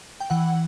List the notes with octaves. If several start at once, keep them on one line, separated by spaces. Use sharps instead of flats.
G5
E3 F#5